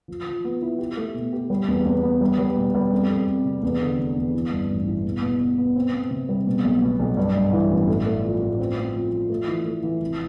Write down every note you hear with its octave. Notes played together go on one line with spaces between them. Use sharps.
F3
F3
B3
E4
G4
A3
B2
G4
G3
E2
E2
B3
G3
G3
B2
G3
F2
F2
F2
C3
E2
D3
F1
E2
E3
G2
A1
E3
B2
B2
B2
B3
C4
C4
C3
G3
B2
B1
B2
B1
G2
G2
E3
A1
A2
A3
F3
A2
C4
C4
F3
F3
A3
E3
A3
E3
F1